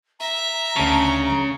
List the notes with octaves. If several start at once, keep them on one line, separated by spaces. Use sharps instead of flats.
E5 A#5
D2 C#3 A5